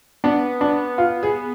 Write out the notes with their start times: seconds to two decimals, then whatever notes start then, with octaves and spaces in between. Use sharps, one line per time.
0.24 B3 D4
0.61 D4
0.98 F4
1.23 G#4